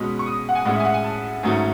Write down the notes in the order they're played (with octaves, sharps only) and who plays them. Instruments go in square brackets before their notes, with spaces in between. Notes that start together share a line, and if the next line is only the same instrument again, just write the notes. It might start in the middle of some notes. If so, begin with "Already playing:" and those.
Already playing: [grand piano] B2 G#3 C#4 B5
C#6
D#6
F#5
G#5
A2 G#3 C#4 F#5
E5
G#5
F#5
G#5
A5
G#2 D#3 F#3 A3 C#4